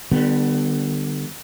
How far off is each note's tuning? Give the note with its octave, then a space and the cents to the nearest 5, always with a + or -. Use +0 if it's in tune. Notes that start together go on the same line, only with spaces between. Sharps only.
D3 +35 G3 +0 B3 +0